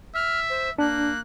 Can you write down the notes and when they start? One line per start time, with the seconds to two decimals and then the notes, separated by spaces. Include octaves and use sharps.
0.15 E5 F6
0.50 C5
0.78 A#3 D4 F#6